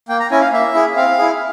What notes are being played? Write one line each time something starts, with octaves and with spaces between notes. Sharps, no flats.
A#3 G5
A#5
C#4 E4 G#5
F5
A#3 E5
E4 G#4
C4 F5
E4 G#4